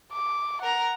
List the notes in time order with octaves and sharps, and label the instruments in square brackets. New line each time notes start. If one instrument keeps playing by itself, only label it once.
[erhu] D6
[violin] A#4 A#5 [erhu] F#5